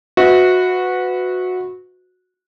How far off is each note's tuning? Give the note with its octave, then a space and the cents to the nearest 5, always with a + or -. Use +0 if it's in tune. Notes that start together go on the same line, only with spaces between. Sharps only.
F#4 -15 B4 +20 E5 -35